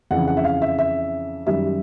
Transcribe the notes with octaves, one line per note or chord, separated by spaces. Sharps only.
F2 C#3 E3 F#5
F#5
E5
F5
E5
E5
F#2 D#3 G3 E5